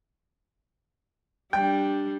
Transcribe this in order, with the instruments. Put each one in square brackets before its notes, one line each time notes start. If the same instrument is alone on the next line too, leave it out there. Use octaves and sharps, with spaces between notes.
[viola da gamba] G3 D4 [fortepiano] G5